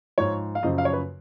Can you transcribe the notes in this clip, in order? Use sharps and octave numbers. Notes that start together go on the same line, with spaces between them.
G#2 F3 C#5
F5
F#2 C#3 F3 D#5
F5
C#5
B4